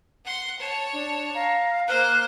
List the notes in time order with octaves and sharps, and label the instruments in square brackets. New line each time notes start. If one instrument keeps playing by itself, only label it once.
[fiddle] F#5 C6
C#5 A5
[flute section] D4
F5 A#5
[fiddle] A#3 C5 [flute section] F6 F#6